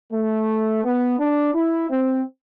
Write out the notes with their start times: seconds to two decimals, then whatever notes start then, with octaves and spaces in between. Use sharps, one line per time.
0.12 A3
0.84 B3
1.19 D4
1.54 E4
1.90 C4